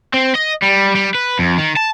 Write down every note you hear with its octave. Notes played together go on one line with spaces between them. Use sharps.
C4
D#5
G3
G3
B4
F2
D#3
A5